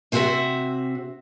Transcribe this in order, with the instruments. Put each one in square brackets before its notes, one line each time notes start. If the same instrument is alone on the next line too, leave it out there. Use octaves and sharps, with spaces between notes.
[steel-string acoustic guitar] C3 C4 F#4 G4 E5 F#5